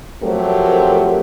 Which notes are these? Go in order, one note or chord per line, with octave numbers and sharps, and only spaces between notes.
F3 F#3 A3 C4 G4 A#4